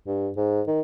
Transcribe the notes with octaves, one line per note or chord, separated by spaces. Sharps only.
G2
G#2
D#3